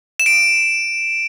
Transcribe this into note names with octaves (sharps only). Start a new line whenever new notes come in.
E7
D7